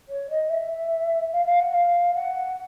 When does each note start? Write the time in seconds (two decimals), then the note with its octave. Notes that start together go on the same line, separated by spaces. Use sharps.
0.09 C#5
0.30 D#5
0.50 E5
1.32 F5
1.46 F5
1.60 F#5
1.74 F5
2.15 F#5